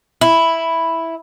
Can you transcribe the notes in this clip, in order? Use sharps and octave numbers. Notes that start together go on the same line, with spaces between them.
E4